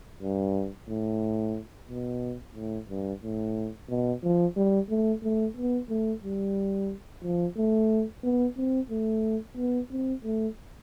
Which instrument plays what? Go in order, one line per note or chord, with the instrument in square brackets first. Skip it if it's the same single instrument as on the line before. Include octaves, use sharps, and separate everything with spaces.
[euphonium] G2
A2
B2
A2
G2
A2
B2
F3
G3
A3
A3
B3
A3
G3
F3
A3
B3
C4
A3
B3
C4
A3